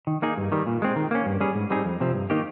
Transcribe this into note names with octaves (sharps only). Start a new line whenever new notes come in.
D#3
A#3 D#4 G#4
G2
D#3 G3
A#2
G#3 C4
D#3
A#3 C#4
G2
G3 C#4 G#4
G#2
G3 C4 D#4 G#4
F2
C3 F3 C4
G2
D#3 A#3 D#4 G4